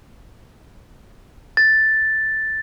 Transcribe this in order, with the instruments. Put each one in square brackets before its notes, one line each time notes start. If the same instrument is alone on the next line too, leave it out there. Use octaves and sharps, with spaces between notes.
[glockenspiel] A6